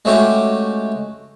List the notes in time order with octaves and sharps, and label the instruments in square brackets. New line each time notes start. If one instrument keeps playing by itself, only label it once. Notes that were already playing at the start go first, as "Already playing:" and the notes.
[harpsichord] G#3 A3 C#4 F#4 G4